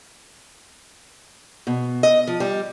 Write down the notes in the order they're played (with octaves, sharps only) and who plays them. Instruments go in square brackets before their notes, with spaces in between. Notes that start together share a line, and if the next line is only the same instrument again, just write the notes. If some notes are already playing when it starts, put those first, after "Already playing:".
[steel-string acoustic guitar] B2
D#5
F3
G3